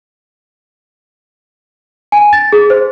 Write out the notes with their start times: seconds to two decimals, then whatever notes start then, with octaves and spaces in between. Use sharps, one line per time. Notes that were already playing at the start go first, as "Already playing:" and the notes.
2.12 G#5
2.33 A6
2.52 G#4
2.70 C5